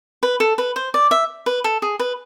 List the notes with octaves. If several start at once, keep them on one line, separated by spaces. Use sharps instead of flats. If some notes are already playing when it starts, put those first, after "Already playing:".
B4
A4
B4
C5
D5
E5
B4
A4
G#4
B4